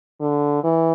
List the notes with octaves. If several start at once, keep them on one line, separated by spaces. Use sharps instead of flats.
D3
E3